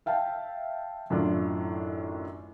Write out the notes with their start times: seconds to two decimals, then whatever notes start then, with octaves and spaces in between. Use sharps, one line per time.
0.06 E5 F5 G5 A5
1.10 F#2 A2 D#3 D4 F4